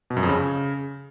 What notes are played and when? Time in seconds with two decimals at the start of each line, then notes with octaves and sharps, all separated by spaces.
0.10 B2
0.17 F#2
0.23 F2
0.29 C#3